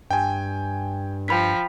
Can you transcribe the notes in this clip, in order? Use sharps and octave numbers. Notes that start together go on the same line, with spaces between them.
G2 G5 G#5
F3 G5 B5 B6